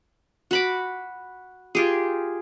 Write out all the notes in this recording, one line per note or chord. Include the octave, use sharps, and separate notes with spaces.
F#4 B5 D6
F4 G4 G#4